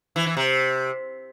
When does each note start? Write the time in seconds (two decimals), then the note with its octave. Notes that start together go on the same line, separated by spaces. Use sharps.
0.16 E3
0.26 E3
0.37 C3